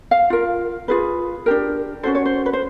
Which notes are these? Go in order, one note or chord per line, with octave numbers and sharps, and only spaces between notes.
F5
F4 A#4
F4 G#4 B4
D4 G4 A#4
C#4 F#4 A4 C5
C#5
C5
B4
C5